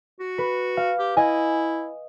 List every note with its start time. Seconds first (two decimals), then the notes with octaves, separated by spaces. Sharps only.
0.20 F#4
0.38 B4
0.77 F5
0.99 G4
1.17 E4 D#5 G#5